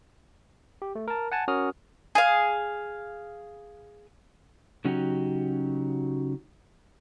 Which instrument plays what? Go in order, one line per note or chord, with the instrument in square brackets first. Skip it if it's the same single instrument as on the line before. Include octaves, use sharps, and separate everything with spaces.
[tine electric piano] G4
A3
A#4 A5
F#5 G#5 A5
C#4 F#4 A#4 D#6 F6
[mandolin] G#4 F5
[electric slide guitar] C#3 F#3 C#4 D#4 F#4 G4